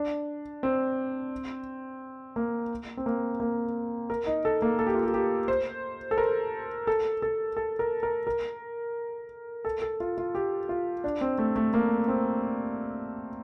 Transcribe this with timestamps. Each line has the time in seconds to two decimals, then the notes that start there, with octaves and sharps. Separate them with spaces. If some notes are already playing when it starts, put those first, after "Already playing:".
Already playing: D4
0.63 C4
2.36 A#3
2.97 C4
3.06 A#3
3.40 A#3
4.10 A#4
4.26 D#4
4.45 A4
4.62 A#3
4.79 A4
4.87 G4
4.95 F4
5.03 G4
5.14 G4
5.48 C5
6.11 A4
6.18 A#4
6.87 A4
7.22 A4
7.57 A4
7.79 A#4
8.03 A#4
8.27 A#4
9.65 A4
9.82 A4
10.00 F4
10.18 F4
10.35 G4
10.69 F4
11.04 D4
11.21 C4
11.38 A3
11.56 A3
11.74 A#3
12.08 C4